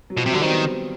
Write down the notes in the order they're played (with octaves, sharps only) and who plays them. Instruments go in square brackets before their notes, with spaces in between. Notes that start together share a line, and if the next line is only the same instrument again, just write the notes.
[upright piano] F#3
[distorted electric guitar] B2 [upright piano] F3
[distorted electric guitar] C3 [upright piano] F#3
[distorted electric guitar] D3 [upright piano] G3
[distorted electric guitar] D#3 [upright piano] C4
[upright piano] B3